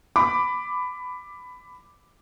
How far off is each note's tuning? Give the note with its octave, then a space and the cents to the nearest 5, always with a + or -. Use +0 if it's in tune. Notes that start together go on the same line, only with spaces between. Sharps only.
B5 +15 D6 +0